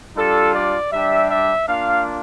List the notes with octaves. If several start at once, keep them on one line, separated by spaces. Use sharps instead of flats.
G3 D4 F4 A4
D5
G3 D4 G4 E5
E5
A#3 D4 F4 F5